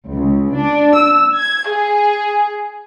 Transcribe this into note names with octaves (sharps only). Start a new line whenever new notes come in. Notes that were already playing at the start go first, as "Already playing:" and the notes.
C#2
D4
E6
G#6
G#4